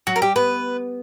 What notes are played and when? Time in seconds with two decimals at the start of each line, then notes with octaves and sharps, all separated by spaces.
0.07 F#3 F#4
0.16 A#4
0.22 G3 G4
0.36 B3 B4